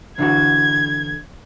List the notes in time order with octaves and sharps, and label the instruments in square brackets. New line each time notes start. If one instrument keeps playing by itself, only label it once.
[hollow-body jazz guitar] D3 E3 F#4 [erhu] G#6